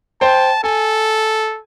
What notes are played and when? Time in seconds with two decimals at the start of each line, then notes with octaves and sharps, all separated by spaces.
0.21 C5 G5 A5
0.64 A4 G#5